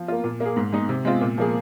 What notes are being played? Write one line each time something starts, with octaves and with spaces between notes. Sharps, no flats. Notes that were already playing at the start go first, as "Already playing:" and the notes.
Already playing: F3
A#3 F4
A#2
A#3
G#4
G#2
G#3 D#4
C3
G#3 C4 F4
A#2
F3 A#3 G#4